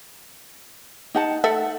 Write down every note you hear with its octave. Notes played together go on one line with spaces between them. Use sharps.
D#4 F#5 A5
A3 A4 E5 F#5